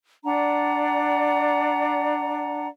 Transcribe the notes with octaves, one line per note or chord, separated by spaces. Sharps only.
D4 D5 F#5 A#5